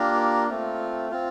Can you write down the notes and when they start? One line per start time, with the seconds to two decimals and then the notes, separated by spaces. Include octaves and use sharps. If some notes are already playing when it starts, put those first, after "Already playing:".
Already playing: A#3 D4 F4 G4 A#4
0.51 A3 C4 F4
1.11 C4 F4